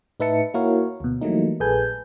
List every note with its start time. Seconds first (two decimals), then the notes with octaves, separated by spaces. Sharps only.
0.20 A2 D#4 B4 E5 A5 C#7
0.54 A#3 E4 F#4 A#4 C#5 F5
1.00 D2 B2
1.21 E3 F#3 G3 A3 A#3 D#4
1.60 A#1 G#4 A4 B4 G#5 G6